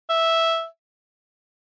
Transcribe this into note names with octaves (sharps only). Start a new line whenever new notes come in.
E5